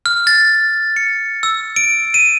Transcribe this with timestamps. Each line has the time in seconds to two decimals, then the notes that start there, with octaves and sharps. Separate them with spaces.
0.06 F6
0.27 A6
0.96 C#7
1.43 E6
1.76 D7
2.14 D#7